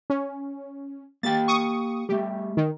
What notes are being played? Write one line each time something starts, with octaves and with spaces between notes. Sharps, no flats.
C#4
A#3 G4 G5 A6
C#6 D#6
G3 A3 G4
D#3